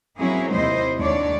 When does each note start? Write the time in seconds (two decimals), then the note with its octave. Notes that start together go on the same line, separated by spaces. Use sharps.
0.18 F#3 A#3 C4 C#4 E4 G#4
0.52 D#2 C3 E4 C5 D#5
0.97 D#2 G#3 D4 C#5 D5